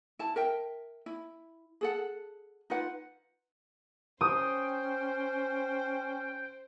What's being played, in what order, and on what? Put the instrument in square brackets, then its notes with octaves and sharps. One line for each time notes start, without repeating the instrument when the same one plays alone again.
[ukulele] E4 A5
A#4 E5 G5
E4
G#4 A4 F#5
D#4 F4 B4 F#5
[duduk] C#4 [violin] C5 [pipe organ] G5 [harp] D#6